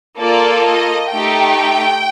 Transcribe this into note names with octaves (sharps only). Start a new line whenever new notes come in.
A#3 F4 A4 D5
D#5
A3 D#4 G4 G5